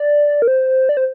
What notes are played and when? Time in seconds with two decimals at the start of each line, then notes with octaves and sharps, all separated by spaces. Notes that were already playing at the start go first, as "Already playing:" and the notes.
Already playing: D5
0.42 A#4
0.48 C5
0.89 D5
0.97 C5